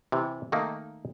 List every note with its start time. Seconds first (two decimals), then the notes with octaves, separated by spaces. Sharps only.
0.12 C3 E3
0.52 D#3 A3 A#3 D#4